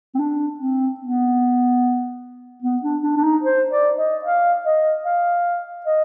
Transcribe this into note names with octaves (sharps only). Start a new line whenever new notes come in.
C4
D4
C4
B3
B3
D4
D4
D4
D#4
C5
D5
D#5
F5
D#5
F5
D#5